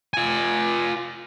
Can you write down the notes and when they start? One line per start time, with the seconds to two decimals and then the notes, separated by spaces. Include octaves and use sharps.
0.14 F4 G#5